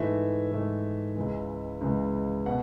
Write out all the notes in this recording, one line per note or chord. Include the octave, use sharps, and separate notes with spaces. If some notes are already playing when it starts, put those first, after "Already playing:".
Already playing: G#2 E3 A3 E5
G#2 E3 A3
C#2 C#3 E3 G#3
C#2 C#3 E3 G#3
B2 F#5